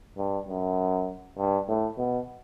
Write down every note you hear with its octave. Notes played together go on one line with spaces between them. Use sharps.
G2
F#2
G2
A2
B2